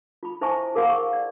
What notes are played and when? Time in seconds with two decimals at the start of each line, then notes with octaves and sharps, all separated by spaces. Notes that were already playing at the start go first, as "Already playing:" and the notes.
0.23 F4 B5
0.41 E4 C5 E5 G#5 A5 C#6
0.75 F#4 G#4 A#4 F5 F#5 C6
0.89 C#6
1.13 D5